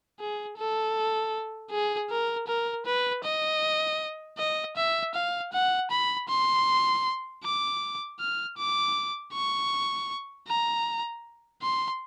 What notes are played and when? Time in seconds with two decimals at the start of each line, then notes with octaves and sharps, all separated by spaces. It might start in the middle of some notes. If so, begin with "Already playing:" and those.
0.20 G#4
0.57 A4
1.71 G#4
2.10 A#4
2.48 A#4
2.86 B4
3.24 D#5
4.38 D#5
4.77 E5
5.15 F5
5.53 F#5
5.91 B5
6.29 C6
7.44 D6
8.20 F6
8.57 D6
9.33 C#6
10.48 A#5
11.62 C6